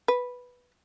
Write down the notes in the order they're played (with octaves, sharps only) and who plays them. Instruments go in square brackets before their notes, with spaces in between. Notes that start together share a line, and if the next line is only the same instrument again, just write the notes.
[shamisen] B4